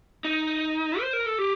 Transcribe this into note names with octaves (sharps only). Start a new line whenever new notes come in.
D#4
C5
A#4
A4
G4